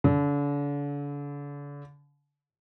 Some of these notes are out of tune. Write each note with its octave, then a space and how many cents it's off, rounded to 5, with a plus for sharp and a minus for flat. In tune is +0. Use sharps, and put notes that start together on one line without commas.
D3 -40